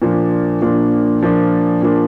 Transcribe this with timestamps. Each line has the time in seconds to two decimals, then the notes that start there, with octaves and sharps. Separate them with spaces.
0.02 A#2 F3 A#3 D4
0.61 A#2 F3 A#3 D4
1.22 A#2 F3 A#3 D4
1.82 A#2 F3 A#3 D4